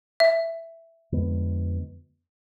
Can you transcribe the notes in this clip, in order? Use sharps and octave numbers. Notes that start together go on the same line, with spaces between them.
E5
F2 D3 G#3 B3